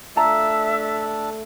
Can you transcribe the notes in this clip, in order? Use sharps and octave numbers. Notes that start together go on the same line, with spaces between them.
A3 D4 F4 A4 E5 A5 A#5